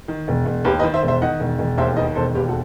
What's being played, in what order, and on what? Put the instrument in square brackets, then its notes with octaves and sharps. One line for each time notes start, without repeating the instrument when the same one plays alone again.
[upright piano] D#3
E1
E1
D#2 G4 B4
B4 D#5
D#3
C5 E5
E1
C5 E5
D#3 D#5 F#5
E1
E1
D#2 C5 E5
D#3 B4 D#5
E1 A4 C5
D#2 G4 B4
F#4 A4